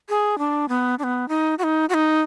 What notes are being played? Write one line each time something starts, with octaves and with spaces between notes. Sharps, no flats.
G#4
D4
B3
D4
B3
D#4
F#4
D#4
F#4
D#4